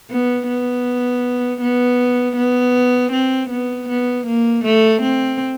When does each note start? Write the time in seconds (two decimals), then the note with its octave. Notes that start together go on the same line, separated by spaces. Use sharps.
0.10 B3
0.48 B3
1.61 B3
2.37 B3
3.12 C4
3.50 B3
3.89 B3
4.27 A#3
4.64 A3
5.02 C4